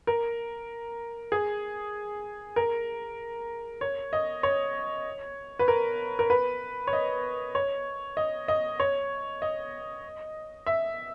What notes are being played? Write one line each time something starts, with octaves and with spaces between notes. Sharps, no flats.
A#4
G#4
A#4
C#5
D#5
C#5
B4
A#4
A#4
B4
C#5
D#5
C#5
D#5
D#5
C#5
D#5
E5